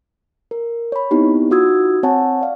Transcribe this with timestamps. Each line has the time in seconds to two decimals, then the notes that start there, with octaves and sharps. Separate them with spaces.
0.51 A#4
0.92 C#5 B5
1.11 B3 C4 D#4 E4 G4
1.50 D#4 F4 F#4 D#6 E6 G#6
2.03 C4 C#5 F#5 G#5 A5
2.41 D5 F5